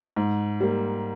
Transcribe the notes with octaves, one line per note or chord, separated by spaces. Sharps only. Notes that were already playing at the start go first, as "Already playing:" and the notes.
G#2
G3 A#3